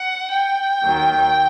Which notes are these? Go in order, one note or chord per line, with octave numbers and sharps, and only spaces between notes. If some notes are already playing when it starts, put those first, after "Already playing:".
Already playing: F#5
G5
D#2 D#3 F#3